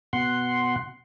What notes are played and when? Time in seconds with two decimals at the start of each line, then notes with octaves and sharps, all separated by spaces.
0.13 B2 F#5 C6